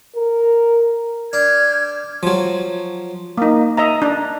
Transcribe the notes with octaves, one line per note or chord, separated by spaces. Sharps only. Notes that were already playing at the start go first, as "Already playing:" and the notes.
A#4
D4 F6 G6 G#6
F3 F#3
A#3 D#4
D#5 E5 A#5
D4